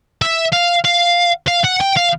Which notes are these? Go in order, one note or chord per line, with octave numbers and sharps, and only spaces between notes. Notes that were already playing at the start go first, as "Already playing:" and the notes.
E5
F5
F5
F5
F#5
G5
F5